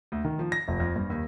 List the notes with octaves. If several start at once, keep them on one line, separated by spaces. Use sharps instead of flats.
D2
D#3
F3
A#6
F1
F2
G2
D#2